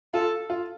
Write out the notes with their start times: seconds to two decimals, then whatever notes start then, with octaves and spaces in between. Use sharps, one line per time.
0.14 F4 A4
0.50 F4